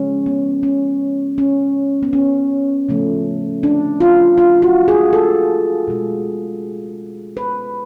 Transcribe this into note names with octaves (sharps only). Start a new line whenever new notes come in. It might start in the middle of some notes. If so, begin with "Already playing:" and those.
Already playing: C#3 F3 G#3 C#4
B3
C#4
C#4
B3
C#4
C#3 F3 A3
D4
F4
F4
F#4
G#4
A4
B2 G#3
B4